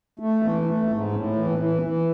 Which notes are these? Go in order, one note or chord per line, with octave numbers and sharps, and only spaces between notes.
A3
E3
A3
G#2
A2
E3
E3
E3